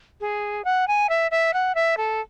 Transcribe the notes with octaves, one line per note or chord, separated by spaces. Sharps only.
G#4
F#5
G#5
E5
E5
F#5
E5
A4